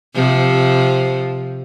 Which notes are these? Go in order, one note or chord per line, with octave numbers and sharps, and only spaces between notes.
C3 F3